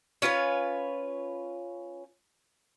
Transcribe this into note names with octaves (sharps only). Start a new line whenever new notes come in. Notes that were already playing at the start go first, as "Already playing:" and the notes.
C#4 F4 B4 C#5